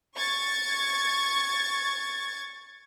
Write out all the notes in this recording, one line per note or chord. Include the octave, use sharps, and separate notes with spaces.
C#6 G#6 A6